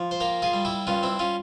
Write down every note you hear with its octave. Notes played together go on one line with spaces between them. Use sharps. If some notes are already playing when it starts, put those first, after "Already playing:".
Already playing: F3
C5
A#3 G4 A#4
F4 G#4
G3
E4 G4
G2 C#4 F4
C4 E4
C#4 F4